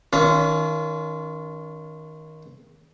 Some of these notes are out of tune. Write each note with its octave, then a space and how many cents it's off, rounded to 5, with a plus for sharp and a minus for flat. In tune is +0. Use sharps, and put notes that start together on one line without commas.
D#3 +15 C#4 +40 F4 -25